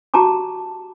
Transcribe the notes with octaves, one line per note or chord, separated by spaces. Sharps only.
F#4 G4 A5 A#5 D6